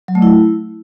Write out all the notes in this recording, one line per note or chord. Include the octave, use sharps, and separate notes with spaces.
F#3
A3
E4